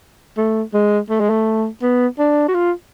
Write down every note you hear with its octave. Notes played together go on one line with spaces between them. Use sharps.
A3
G#3
A3
G#3
A3
B3
D4
F#4
F4